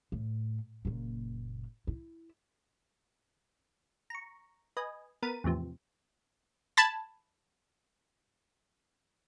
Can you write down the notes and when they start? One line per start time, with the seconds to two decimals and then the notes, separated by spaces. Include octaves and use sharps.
0.12 A2
0.85 F#1 A#2
1.87 E4
4.10 A#5 C#6
4.77 B4 D#5 G#5
5.22 B3 A#4 B5 A6 D#7
5.44 E2 A2 C3 F3
6.77 A5 B5 G#6 A6